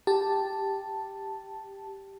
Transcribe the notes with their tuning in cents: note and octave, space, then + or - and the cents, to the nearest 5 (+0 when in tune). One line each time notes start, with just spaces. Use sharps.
G4 +0 A5 +0